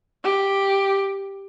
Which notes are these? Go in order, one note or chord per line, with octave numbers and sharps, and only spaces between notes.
G4